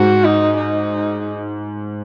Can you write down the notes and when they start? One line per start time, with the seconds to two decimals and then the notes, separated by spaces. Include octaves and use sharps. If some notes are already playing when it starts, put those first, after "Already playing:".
Already playing: G#2 F#4
0.24 D#4
0.57 D#4